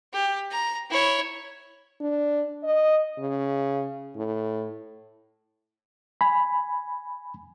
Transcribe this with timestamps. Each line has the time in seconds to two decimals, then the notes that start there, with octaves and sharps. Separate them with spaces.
0.13 G4
0.51 A#5
0.90 E4 C#5
2.01 D4
2.64 D#5
3.19 C#3
4.16 A2
6.21 G#5 B5